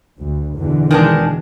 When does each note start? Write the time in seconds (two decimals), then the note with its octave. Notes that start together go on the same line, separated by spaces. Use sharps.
0.20 D2
0.56 E2 B2 D3
0.91 D#3 G#3 D4